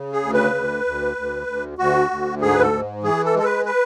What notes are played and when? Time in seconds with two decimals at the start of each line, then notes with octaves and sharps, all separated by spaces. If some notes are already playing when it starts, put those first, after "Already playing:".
Already playing: C#3
0.12 G#4
0.23 D2
0.34 B4
0.55 D2
0.85 D2
1.17 D2
1.47 D2
1.78 D2 F#4
2.11 D2
2.41 G#2 G#4
2.54 B4
2.62 A4
2.72 G#2
3.03 E3 G#4
3.25 A4
3.35 G#3 A4
3.44 B4
3.66 B4